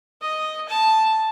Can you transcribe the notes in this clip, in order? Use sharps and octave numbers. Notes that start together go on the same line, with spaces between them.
D#5
A5